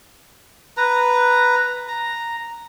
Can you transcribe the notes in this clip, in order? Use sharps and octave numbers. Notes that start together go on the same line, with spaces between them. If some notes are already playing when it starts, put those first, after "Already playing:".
B4 A#5
A#5